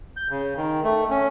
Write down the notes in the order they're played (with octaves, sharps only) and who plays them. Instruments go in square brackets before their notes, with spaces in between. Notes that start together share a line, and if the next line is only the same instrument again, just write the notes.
[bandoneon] G6
C#3
D#3
A3
C#4